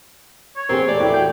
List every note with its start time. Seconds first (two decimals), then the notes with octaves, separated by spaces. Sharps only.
0.57 C#5
0.69 E2 C4 G4 G#4 A#4
0.88 A3 D5
1.00 E3 A3 E4 G4
1.14 F#4 G5